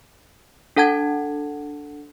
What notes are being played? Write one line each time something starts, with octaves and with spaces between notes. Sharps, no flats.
D4 A4 F#5 A5 G#6